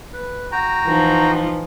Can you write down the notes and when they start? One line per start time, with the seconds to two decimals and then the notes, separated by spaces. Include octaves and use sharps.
0.14 B4
0.52 F#4 G5 A#5
0.86 E3 F3 D#4